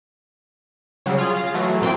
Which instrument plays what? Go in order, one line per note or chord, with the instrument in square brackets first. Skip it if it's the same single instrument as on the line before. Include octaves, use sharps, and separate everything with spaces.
[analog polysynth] C#3 F#3 G3
F4 G#4
F5 A#6
E3 F#3 A3
A#2 E3 C4 G5